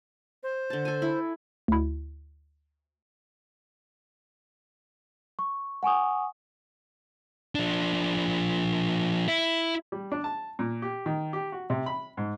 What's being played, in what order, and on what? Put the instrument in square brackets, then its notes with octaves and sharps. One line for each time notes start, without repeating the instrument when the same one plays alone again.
[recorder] C5
[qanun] D3 A5
A4 G#5
E4
[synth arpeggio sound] D2 E4
[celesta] C#6
F#5 G#5 C#6 D#6
[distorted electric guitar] F3 D4
E4
[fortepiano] G3
D4
A5
A#2
G4
D#3
G4
F#4
C3
B5
G#2